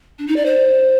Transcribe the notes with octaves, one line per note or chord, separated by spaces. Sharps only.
D4
D#4
D5
C5